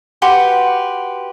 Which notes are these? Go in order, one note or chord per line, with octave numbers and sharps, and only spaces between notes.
F#4 G4 B4 C6